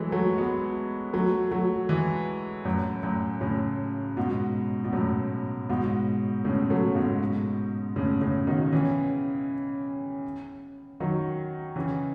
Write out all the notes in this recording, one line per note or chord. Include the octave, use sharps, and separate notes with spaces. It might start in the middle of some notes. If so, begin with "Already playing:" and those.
Already playing: E3 F#3 G#3 A3
F#3 A3
G#3 B3
F#3 A3
F#3 A3
E3 G#3
F#2 A2
F#2 A2
A2 C#3
G#2 B2
B2
F#2 A2
G#2 B2
A2 C#3
F#3 A3
G#2 B2
A2 C#3
A2 C#3
B2 D#3
C#3 E3
D#3 F#3
C#3 E3